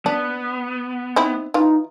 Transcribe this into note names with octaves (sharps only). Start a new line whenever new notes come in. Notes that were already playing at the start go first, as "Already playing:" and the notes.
B3 D4
C4 D#4 E4
E3 D#4 F4